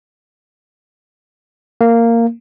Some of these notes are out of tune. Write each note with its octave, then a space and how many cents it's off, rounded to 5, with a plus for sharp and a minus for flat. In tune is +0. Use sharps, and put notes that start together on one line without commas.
A#3 -10